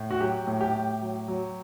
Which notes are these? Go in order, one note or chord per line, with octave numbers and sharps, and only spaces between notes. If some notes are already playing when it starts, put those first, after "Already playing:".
Already playing: A2
F#4
F#3 G4
A2
G4
A2
F#3
F#3